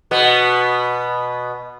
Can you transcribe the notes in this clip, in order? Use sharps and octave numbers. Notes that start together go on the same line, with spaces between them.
B2 B3